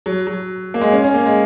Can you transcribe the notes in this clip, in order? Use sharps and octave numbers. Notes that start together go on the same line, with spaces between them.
F#3
F#3
A#3
G#3
C#4
C#4
A#3
G#3